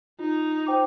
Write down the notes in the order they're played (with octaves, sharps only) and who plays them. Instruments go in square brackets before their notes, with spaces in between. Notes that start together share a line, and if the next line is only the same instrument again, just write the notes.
[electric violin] D#4 [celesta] F4
[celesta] C5 G5 D6